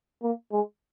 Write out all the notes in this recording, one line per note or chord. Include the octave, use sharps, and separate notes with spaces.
A#3
G#3